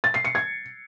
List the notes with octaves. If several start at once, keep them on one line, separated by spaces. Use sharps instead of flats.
A6
C7
C#7
G#6